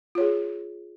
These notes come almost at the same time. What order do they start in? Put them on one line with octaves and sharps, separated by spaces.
F4 C#5 G#4